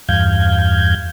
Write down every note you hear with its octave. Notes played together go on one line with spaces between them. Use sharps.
E2 G2 F5 G6 G#6